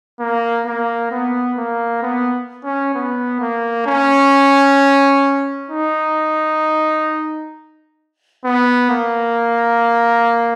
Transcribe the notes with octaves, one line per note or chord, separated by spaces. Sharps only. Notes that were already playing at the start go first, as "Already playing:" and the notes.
A#3
A#3
B3
A#3
B3
C#4
B3
A#3
C#4
D#4
B3
A#3